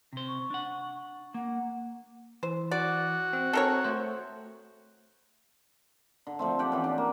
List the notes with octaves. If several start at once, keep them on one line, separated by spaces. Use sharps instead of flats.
C3 C5
C#6
D4 F#5
A#3 F#5
E3 C5
F#4 D5
C4
C4 A4 A#4 C#5
A3 C5
D3
F3 A3 C4
G4 D5 F#5 G5
E3 C#4
D4
A#3